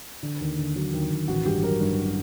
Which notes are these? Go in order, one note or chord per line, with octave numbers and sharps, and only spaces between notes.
D3
D#2
D3
F#3
D#2
D#2
A1 F#4
G2 G4
F#3 A#4
G2